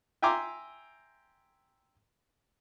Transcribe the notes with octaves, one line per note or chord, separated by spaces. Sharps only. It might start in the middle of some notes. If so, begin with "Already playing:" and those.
E5 G5 G#5 A#5 C6 D6